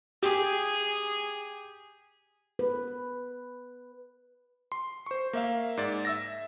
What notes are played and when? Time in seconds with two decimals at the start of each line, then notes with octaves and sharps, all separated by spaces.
0.23 G4 G#4
2.59 B4
4.72 C6
5.06 C5 C#6
5.33 A#3 E5 F5
5.77 G#2 D5 A6
6.05 E5 E6 A#6